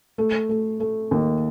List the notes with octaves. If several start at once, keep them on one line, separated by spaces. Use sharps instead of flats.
A3
A3
A3
D#2